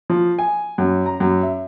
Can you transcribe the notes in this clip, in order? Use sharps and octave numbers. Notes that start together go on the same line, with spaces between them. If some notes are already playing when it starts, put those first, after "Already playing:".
F3
G#5
F#2
A#5
F#2
E5